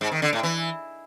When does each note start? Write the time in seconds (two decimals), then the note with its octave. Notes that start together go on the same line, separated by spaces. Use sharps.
0.01 G#2
0.12 D#3
0.22 D3
0.33 A2
0.43 E3